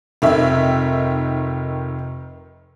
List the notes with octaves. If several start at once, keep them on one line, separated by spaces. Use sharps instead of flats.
F1 D#3 E5